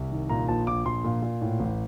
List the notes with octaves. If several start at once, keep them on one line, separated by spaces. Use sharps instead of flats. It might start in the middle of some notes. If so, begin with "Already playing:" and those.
Already playing: C2
D#3
A#2 A#5
A#1 A5
A#1 D6
A#1 C6
A#2
A#2
A2
A1